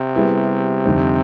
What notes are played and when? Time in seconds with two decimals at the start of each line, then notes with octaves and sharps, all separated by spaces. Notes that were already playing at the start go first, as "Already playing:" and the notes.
Already playing: C3
0.15 G3 B3 E4 G#4 B4
0.85 F2 D3 G3 C4 D#4